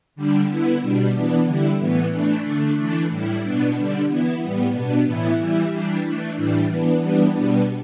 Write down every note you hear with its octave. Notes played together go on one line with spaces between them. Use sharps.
D3 G3 D4
D3 B3 E4
B2 G3 D4
E3 B3 D4
D3 G3 E4
A2 E3 B3
E3 A3 D4
D3 A3 D4
E3 A3 D4
A2 G3 E4
B2 B3 D4
D3 G3 D4
E3 B3 E4
A2 G3 B3
B2 B3 D4
A2 E3 B3 E4
E3 G3 E4
E3 G3 D4
E3 A3 D4
A2 E3 G3 D4
E3 B3 D4
E3 G3 B3 D4
B2 G3 B3 D4